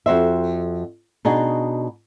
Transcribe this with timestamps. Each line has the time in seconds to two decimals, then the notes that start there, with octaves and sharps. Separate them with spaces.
0.06 F2 F#4 C5 E5
1.25 B2 D4 D#4 F#4 G#4